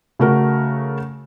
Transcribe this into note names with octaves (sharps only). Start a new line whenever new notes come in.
C#3 A3 F#4 A#4